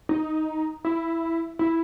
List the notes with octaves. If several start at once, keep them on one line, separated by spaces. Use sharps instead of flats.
D#4
E4
E4